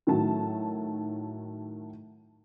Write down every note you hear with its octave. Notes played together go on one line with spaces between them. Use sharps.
A2 D#3 F#3 A5